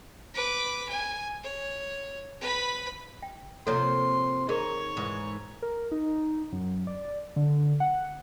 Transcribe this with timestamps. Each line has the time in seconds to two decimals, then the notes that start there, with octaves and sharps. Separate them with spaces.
0.34 B4 D6
0.89 G#5
1.43 C#5
2.41 B4 B5
3.23 G5
3.67 C3 F3 A#3 A4 C#5 C6
4.49 D#2 D#4 G#4 A#4 C#5
4.97 G#2 E3
5.62 A#4
5.91 D#4
6.52 F#2
6.87 D5
7.36 D3
7.80 F#5